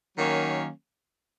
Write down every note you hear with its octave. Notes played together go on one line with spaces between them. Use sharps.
D#3 F#3 A#3 C#4